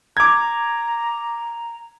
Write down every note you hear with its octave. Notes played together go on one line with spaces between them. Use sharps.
A#5 D6 G#6